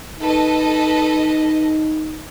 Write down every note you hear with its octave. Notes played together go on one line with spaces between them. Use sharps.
D#4 A4 B4 D#5